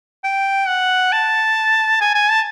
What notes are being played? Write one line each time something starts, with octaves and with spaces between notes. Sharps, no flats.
G5
F#5
A5
G#5
G#5
A5